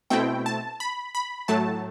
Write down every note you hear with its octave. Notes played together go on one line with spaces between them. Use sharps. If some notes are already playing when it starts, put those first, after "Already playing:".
B2 A3 C4 E4 G5
A5
B5
B5
A2 F#3 A3 A5